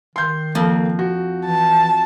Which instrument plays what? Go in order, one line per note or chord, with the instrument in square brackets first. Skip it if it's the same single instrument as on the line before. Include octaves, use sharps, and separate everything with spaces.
[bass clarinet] D#3 [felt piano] C6 G6
[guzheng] F2 [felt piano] A#3
[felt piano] F#4
[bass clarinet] E3 [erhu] A5